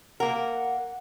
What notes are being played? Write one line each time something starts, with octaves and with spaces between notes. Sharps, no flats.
A#3 A#4 F#5